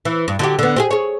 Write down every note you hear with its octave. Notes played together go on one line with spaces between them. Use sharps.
E3
G2
D3 F#3 G4
D3 B3
C4 G4 G#4
G#4 C#5